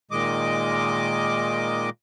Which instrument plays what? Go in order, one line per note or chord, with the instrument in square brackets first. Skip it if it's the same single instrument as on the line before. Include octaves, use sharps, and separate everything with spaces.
[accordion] A#2 D#3 G#3 D#5 D6